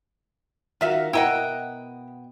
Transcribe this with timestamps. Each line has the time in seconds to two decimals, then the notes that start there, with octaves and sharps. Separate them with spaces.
0.81 D#3 F4 F#4 A#4 E5 F5
1.13 B2 E4 A#4 D#5 F#5 G5